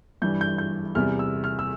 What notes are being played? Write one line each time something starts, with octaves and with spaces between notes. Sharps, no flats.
G2 E3 G3 G6
G6
G6
E2 C3 G3 F6
E6
F6
E6